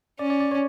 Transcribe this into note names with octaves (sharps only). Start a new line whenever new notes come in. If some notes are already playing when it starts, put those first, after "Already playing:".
C#4 D5
D5
D5
C#5